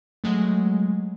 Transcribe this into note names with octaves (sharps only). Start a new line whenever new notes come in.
F#3 G#3 A3